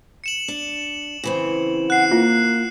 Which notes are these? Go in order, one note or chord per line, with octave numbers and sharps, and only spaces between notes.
C#7 E7 F#7
D4
C#3 E3 C4
F#5 F#6 C7
A#3 F4